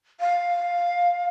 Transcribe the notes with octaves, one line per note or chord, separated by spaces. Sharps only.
F5